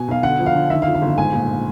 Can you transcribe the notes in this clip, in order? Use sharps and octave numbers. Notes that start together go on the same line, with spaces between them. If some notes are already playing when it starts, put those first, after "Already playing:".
Already playing: B2 G#5
B1 F5
D3 F#5
F3
F5
D3
D#3 E5
F5
F2
F5
G1
G#2 G#5
A#1